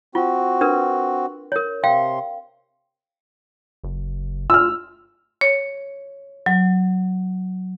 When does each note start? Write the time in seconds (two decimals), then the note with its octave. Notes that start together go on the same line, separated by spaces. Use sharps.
0.15 C4 F4 F#4
0.61 D4 A#4 B4
1.52 A#4 C#5
1.84 C3 F5 G5 C6
3.84 F#1
4.50 F4 E6 F6
5.41 C#5
6.46 F#3